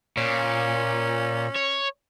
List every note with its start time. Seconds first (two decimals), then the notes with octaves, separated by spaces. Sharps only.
0.17 A#2 C#4
1.56 C#5